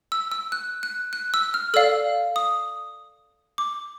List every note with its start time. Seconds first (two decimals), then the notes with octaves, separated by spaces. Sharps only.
0.12 E6
0.31 E6
0.52 F#6
0.83 F#6
1.13 F#6
1.34 E6
1.54 F6
1.74 A4 D5 F5 E6
2.36 D#6
3.58 D6